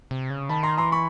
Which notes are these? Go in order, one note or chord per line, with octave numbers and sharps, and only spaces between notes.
C3
C#3
D#3 A5 B5
A#5 C6
E3 A#5 C6
B5 C#6